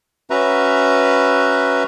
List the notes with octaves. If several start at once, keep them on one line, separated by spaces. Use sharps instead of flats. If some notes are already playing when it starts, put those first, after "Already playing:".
C#4 F#4 B4 E5 A#5